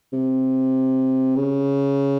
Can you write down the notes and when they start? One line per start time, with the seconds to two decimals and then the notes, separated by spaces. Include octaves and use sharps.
0.13 C3
1.36 C#3